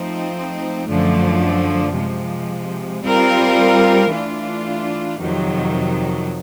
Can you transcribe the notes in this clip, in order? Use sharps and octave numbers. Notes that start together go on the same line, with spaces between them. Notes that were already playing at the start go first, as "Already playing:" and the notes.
Already playing: F3 A3 C4 D#4
F#2 D3 F3 A3
C3 F3 G#3
G3 C4 F4 A#4
E3 A3 D4 F4
F2 C3 D#3 F#3